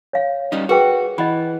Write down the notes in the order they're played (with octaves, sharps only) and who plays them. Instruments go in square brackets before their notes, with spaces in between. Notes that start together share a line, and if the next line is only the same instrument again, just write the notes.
[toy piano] C#5 F5
[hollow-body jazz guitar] G3 C#4 D#4
[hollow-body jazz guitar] F#4 [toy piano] G#4 B4 G5
[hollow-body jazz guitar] E3 [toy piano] D#5 F#5 B5